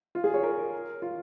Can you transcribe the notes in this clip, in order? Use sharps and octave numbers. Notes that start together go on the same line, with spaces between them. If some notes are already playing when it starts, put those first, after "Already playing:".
F4
G#4
C#5
A#4
F4